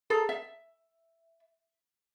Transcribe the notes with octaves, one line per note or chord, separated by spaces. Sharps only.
G#4 A4 A#5
E5